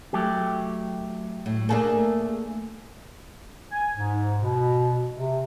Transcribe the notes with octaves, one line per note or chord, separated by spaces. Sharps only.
F#3 A3 G4
A2
A3 A#3 D4 G#4
G#5
G#2
B2
C3